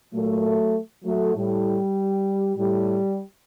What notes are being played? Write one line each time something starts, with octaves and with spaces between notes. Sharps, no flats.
A#2 F#3 A3
F#3 A3
A2 G3
A2 G3